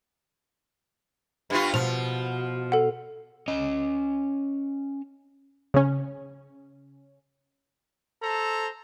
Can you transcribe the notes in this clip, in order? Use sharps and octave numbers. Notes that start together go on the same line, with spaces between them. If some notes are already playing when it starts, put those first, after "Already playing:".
G2 B3 F4
B2 F3 F7
A4 F#5
C#4 D#5
C#3 C#4
A4 C5 A#5